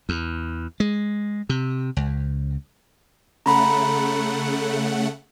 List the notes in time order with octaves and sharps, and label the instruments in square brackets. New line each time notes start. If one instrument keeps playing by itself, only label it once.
[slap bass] E2
G#3
C3
C#2
[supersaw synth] C#3 A3 F#5 [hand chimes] A#5 B5